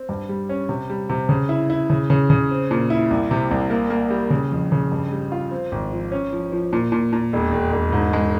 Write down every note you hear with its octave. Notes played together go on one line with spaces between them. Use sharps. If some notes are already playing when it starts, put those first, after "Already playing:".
Already playing: C4
G2
G3
C#4
C3
G3
C3
C#3
E4
E4
C#3
C#3
C#3
C4
A#2
E4
C2
C3
C2
A#3
A#3
G3
C#3
F2
C#3
G2
G3
F4
C4
G#1
F3
C#4
F3
F3
A#2
A#2
A#2
E1
E1
E1
G#2
G#3